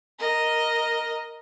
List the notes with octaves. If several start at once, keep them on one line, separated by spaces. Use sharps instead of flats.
A#4 D#5